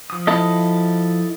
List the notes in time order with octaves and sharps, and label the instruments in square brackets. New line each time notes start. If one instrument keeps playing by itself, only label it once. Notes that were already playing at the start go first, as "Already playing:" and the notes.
[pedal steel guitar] F3 D#6
[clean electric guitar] E4 A4 D#5